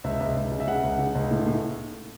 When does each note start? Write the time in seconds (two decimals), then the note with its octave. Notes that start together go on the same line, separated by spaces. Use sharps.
0.04 C#2 E5
0.20 C#2
0.36 C#2
0.51 C#3
0.60 E5
0.67 C#3 F#5
0.83 C#2
0.99 C#3
1.15 C#2
1.31 A2
1.46 A2